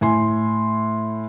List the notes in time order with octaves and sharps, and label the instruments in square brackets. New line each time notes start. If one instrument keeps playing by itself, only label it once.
[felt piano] A2 G#5 C6